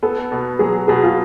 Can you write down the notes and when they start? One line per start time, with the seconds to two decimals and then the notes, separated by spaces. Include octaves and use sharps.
0.03 B3 A4
0.32 B2
0.59 F#3 G#4
0.88 B2 G#4
1.03 F4